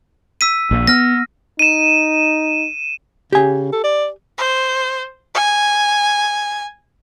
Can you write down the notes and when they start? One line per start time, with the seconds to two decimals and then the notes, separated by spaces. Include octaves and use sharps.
0.41 E6 B6 D#7
0.71 A#1 A#2
0.87 B3 F6 A#6
1.59 D#4 D#7 E7
3.33 C#3 G4 G#5
3.72 A4
3.84 D5
4.38 C5
5.35 G#5